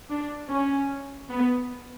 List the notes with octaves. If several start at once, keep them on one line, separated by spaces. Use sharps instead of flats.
D4
C#4
B3